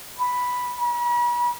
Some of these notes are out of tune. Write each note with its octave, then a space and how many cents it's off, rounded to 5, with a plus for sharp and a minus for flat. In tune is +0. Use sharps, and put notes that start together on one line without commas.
B5 +0
B5 -45